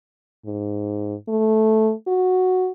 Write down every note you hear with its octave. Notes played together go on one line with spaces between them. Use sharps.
G#2
A3
F#4